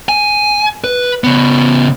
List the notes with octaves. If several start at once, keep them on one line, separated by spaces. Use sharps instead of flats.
G#5
B4
C#3 B3